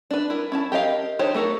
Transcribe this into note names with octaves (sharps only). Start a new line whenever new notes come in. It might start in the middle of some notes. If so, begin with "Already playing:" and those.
D4 B4
E4 A#4
C#4 E4 A5
G4 A#4 D#5 F5
D4 D#4 G4 C5 C#5
A3 F#4 A4 A#4